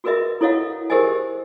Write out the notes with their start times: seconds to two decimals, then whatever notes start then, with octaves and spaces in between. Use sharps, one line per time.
0.04 F#4 G#4 A#4 B4 D#5 E5
0.41 E4 A4 C#5 D#5 F5 F#5
0.90 G4 G#4 A#4 C5 D#5 G#5